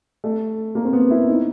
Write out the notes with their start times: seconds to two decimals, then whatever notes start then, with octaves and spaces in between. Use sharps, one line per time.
0.24 A3
0.75 A#3
0.85 C4
0.93 B3
1.11 E4
1.28 D#4